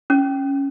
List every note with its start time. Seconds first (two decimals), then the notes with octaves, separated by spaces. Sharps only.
0.10 C#4